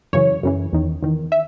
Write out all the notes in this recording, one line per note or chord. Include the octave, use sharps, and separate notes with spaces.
F#2 C#3 E3 C#5
F#2 C#3 E3
E2 D#3
E2 D#3
E5